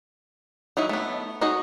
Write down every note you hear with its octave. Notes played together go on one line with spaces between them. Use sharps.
F#3 D#4 E4 F#4
A3 B3
D#4 F#4 G#4 C#5 D#5